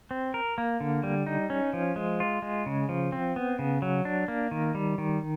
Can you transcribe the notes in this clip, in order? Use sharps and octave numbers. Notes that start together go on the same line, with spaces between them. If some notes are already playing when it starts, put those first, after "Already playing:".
C4
A#4
A#3
D3
G3
D#4
C#4
F3
G#3
F4
G#3
C#3
F3
C4
B3
C#3
F#3
D4
A#3
D#3
G3
D#3